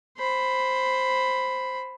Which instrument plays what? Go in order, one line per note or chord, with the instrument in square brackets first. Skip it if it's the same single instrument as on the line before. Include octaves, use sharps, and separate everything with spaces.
[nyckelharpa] C5 B5